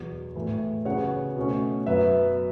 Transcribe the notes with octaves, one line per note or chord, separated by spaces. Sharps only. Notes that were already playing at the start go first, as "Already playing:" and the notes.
Already playing: E2 B2 F#3
A2 E3 A3
C#3 F#3 B3 C#5 F#5
B2 A3 C#4
F#2 F#3 B3 B4 E5